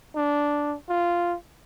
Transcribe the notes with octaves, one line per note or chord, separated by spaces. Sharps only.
D4
F4